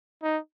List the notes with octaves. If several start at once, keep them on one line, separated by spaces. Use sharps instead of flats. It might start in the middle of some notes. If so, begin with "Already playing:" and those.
D#4